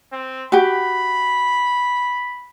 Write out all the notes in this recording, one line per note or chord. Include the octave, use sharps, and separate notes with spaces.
C4
F#4 G4 B5